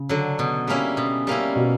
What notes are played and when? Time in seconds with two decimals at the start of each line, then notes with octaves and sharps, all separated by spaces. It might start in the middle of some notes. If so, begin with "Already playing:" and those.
Already playing: C#3
0.09 D3 F#3
0.39 B2
0.68 G3 A#3 C#4 E4
0.97 B2
1.27 G3 A#3 C#4 E4
1.56 B2